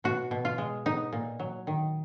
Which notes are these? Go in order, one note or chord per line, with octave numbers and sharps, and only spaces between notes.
B2 F#4
B2
F4
G#3
B3 D#4
A#2
F#3
D#3